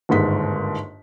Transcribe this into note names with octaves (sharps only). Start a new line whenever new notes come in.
G1 D#2 G#2 B6